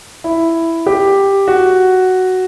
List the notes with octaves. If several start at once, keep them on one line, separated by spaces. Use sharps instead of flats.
E4
G4
F#4